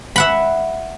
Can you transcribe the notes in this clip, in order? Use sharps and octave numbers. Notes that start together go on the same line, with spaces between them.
E5 F#5 B5